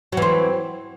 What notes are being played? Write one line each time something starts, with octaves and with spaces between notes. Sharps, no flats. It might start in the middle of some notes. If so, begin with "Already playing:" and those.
E3 F#3 C4